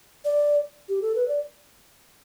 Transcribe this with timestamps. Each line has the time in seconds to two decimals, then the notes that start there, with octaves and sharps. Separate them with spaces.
0.25 D5
0.89 G4
1.02 A4
1.16 B4
1.28 D5